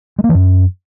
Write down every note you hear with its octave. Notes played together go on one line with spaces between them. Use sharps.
G#3
A#3
E3
F#2